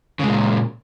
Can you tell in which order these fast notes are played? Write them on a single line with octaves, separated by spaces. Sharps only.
C#3 G#3 A#2